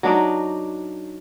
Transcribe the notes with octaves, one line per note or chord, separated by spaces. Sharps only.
F#3 D4 D#4 D5